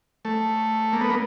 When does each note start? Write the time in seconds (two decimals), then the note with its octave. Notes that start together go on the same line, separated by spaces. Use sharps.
0.25 A3
0.93 A#3
1.01 B3
1.10 A#3